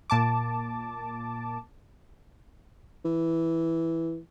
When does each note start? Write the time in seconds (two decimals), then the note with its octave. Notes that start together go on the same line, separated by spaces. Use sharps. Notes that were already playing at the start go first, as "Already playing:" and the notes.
0.10 A#2 A5 D6
3.05 E3